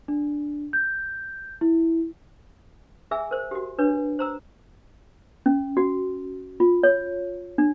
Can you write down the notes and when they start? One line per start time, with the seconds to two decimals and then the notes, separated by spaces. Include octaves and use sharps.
0.08 D4
0.73 G6
1.61 E4
3.11 G#4 E5 G#5 E6
3.31 A#4 C5
3.51 F#4 G4
3.78 D4 B4 C#5
4.19 C5 A#5 E6
5.46 C#4
5.77 F#4
6.60 F4
6.83 C#5
7.58 D4